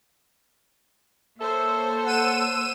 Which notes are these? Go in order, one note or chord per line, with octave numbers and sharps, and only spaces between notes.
A#3 A4 C5 C#5 E5
F#5 E6 D#7 E7